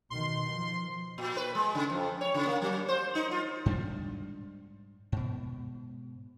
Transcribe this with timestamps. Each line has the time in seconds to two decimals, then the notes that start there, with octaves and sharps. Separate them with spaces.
0.10 B2 D#3 C6
0.52 F3
1.18 A#2
1.37 B4
1.55 G#3
1.75 C#3
1.90 F2
2.21 C#5
2.34 C#3
2.46 A#3
2.62 F#3
2.88 C5
3.15 D#4
3.31 F4
3.66 G#2 G3 A3 D4
5.12 G#2 B2